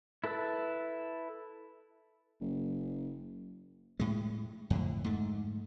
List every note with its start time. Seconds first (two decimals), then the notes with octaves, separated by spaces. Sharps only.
0.24 E4 A4 B4 A5 E6
2.40 F#1
4.00 A2 G#3
4.70 F2 A2 D3
5.04 G#2 A3